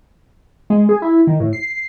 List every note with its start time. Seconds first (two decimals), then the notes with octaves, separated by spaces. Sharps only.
0.70 G#3
0.89 G#4
1.02 E4
1.27 D#3
1.40 A2
1.53 C7